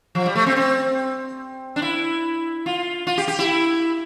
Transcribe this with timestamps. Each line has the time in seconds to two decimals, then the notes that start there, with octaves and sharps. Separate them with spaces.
0.15 F3
0.26 G3
0.35 A3
0.46 C4
0.56 C4
1.76 D4
1.82 E4
2.66 F4
3.07 F4
3.18 G4
3.28 G4
3.39 E4